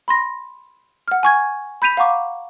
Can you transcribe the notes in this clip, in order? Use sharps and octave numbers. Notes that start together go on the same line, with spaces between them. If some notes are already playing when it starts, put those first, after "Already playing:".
B5 C6 A#6
F#5 F6
G#5 C#6 G#6
B5 G6 B6 D#7 F7
F5 F#5 A#5 C#6 D6